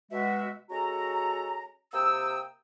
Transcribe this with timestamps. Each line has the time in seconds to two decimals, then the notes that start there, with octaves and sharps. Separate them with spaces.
0.11 B2 G#3 F#4 E5
0.71 G#3 C#4 F#4 A4 A#5
1.93 C3 A#3 G5 D#6 E6